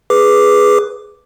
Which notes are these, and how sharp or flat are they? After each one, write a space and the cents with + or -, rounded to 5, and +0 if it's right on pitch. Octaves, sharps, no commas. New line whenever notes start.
G#4 +0 B4 +0 D6 +0